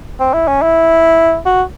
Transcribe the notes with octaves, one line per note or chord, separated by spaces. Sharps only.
C4
E4
C#4
E4
F#4